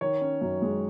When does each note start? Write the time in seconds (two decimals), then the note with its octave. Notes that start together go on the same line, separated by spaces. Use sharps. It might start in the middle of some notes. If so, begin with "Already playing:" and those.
0.01 D#3 C#5
0.21 C#4
0.41 F#2
0.62 G#3